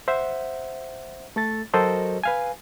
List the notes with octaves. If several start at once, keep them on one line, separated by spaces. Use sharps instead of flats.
C5 E5 F#5
A3 A4 A6
F#3 F#4 A4 A#4 C5 D#5
B4 F5 G#5